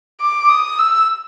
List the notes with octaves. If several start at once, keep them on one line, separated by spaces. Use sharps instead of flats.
D6
D#6
E6